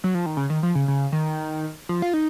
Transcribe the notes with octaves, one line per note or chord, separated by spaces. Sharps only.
F#3
F3
D#3
C#3
D#3
F3
C#3
C#3
D#3
F3
F4
D#4